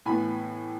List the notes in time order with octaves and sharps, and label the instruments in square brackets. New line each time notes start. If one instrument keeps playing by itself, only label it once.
[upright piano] A2 E3 B3 G#5 B5